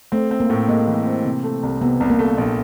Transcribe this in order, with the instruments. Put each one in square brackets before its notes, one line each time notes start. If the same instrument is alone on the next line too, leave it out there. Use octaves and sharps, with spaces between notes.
[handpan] A3 [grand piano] C4
[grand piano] C4
[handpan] A#3
[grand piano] A2
[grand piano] G#3 [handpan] A#3
[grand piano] E3
C4
C3
A3
C2
[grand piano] C3 [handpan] B3
[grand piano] C2
[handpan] A#3
[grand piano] A3
A#1